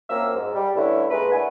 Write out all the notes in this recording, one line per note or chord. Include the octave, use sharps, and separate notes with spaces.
F#2 F3 A#3 C4 E5 E6
G#2
G3
G2 D3 A3 C#4 E4
A#2 G#3 A3 E4 B4
A3 D4 E4 B4 F#5 G#5